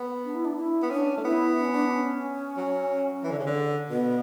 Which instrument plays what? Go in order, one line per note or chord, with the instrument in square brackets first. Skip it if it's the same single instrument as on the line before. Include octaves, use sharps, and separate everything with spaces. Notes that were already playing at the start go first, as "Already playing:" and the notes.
Already playing: [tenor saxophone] B3
[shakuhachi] D4
E4
D4
E4
[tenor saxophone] B3
[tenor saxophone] C#4 [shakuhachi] D4
[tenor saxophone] A3
[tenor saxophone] B3 [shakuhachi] E4
[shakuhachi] D4
C#4
D4
C#4
[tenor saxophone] F#3
E3
D3
C#3
D3
[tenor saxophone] B2 [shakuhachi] B3